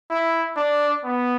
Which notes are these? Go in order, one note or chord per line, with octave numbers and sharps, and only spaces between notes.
E4
D4
B3